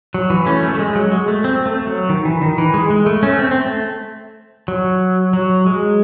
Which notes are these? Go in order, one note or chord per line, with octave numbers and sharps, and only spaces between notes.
F#3
E3
A3 C#4
A3
A3
G#3
F#3
G#3
A3
C4
A3
F#3
D#3
E3
D#3
E3
G#3
G#3
A3
A3 C#4
C4
C4
A3
F#3
F#3
G#3